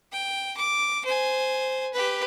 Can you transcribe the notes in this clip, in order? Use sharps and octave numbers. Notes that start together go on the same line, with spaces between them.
G5
D6
C5 G#5
G4 B4